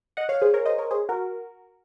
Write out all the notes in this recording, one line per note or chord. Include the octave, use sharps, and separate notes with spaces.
D#5 F#5
C#5 F5
G#4 C5
A#4 C#5
C5 D#5
A#4 C#5
G#4 C5
F#4 A#4